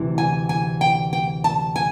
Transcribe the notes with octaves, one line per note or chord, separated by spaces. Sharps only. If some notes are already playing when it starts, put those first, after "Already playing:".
Already playing: D2 C3 E3
G#5
G#5
G5
G5
A5
G#5